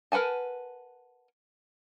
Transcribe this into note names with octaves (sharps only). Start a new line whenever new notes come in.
A#4 B4 F#5 G#5 A5